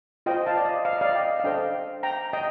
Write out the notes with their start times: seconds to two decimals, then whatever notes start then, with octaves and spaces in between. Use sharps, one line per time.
0.26 F4 C5 D#5 G5
0.46 F5 A5
0.57 D5
0.65 D#5
0.85 F5
0.93 D#5
1.01 D5 F5
1.15 D#5 G5
1.40 F5
1.44 D4 A4 C5 D#5 G5
2.03 G5 A#5
2.33 D#5 G5